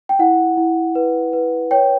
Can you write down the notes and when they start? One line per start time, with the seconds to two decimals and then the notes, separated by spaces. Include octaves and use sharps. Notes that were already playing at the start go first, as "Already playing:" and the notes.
0.09 G5
0.19 E4 F#5
0.57 E4
0.95 B4
1.33 B4
1.71 C#5 G5